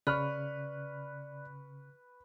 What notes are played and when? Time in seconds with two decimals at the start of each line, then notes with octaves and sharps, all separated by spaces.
0.07 C#3 B4 D5 C#6 F6 F#6